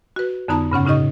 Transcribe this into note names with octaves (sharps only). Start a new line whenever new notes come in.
F#4 B4
F2 D3 B3 D#4 A5 A#5
G2 C#3 C#4 F#5
A2 C#3 D#4 G4 D#5 C#6